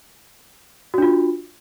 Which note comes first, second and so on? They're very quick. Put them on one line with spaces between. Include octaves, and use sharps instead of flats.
F#4 D4 F4